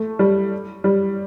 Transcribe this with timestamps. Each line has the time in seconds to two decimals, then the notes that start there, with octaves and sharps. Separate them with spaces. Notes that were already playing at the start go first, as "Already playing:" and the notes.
Already playing: A3
0.19 G3
0.84 G3